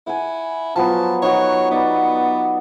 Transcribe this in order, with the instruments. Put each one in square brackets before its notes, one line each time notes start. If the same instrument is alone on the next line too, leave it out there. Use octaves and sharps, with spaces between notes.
[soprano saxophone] E4 [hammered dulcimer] F#5 G#5
[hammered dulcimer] F3 F#3 B3 [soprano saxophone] A5
[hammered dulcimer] D#4 F#4 F#5 [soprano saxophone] C#5
[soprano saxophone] B3 [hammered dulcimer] D#4 D5